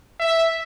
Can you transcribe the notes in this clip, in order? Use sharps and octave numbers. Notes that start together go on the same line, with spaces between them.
E5